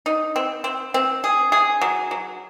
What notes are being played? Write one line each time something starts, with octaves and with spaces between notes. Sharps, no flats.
D#4
C4
C4
C4
G#4
G#4
F#3
F#3